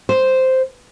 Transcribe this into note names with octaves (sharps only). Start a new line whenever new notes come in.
C5